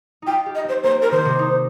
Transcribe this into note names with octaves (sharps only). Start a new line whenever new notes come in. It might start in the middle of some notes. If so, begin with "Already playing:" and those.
D#4 F4 G5
G4
D#5
C4 C5
A#3 C5
A#4
D#3 C5
C3
D#4